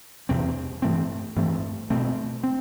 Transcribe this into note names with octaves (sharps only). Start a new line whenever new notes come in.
E2 C3 G3 C4
G2 E3 A3 C4
G2 E3 A3 C4
B2 A3 C4
C4